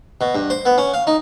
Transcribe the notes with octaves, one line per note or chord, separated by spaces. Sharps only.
B2
G2
C5
B3
C#4
F5
D#4